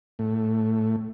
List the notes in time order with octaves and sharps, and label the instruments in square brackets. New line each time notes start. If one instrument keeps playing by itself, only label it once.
[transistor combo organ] A2